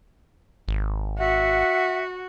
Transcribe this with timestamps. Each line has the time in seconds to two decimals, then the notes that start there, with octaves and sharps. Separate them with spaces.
0.68 G#1
1.18 F#4 E5 F#5